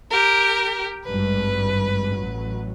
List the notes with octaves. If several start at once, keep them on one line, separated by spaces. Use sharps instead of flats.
G4 A#4
G#1 G2 B4
A1 F#3